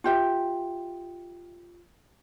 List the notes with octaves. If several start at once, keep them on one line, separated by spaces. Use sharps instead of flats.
F4 G4 E5